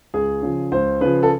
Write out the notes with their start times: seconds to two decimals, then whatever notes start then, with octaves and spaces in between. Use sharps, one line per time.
0.14 C#2 G#4
0.42 C#3 F3
0.72 C#2 C5
1.01 C#3 F3 B4
1.23 A4